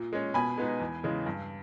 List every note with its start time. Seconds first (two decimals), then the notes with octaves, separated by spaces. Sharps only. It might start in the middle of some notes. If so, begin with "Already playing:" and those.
Already playing: A#2
0.13 G#3 C#4
0.34 B2 G#5 B5
0.58 G#3 B3 D#4
0.80 E2
1.03 C#3 E3 G#3
1.26 G2